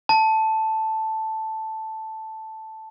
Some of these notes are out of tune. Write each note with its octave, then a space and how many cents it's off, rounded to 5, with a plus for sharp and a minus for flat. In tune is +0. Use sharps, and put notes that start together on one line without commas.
A5 +0